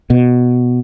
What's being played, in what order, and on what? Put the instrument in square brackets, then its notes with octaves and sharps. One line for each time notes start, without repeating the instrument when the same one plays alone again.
[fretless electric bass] B2